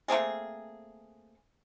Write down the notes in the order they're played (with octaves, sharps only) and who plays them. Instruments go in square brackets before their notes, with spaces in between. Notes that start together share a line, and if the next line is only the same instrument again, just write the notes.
[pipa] A3 A#3 C4 G#4